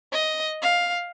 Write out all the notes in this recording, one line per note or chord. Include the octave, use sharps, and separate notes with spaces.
D#5
F5